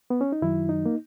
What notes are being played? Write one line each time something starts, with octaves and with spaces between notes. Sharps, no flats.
B3
C#4
D#4
F#2 D#3 F#3 E4
D#4
A#3